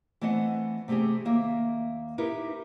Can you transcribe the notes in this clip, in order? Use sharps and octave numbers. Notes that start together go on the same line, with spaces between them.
E3 A3 B3 C4 D#5 F#5
C3 A3 C4 G4 G#4
D#2 A#3 E5
D#4 E4 G4 A#4 B4